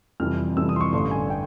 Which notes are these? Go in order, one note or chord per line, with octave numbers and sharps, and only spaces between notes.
F2 C3 E3 G3 F6
F2 C3 E3 G3 E6
D#6
C6
C#6
A1 G2 D3 C6
G#5
G5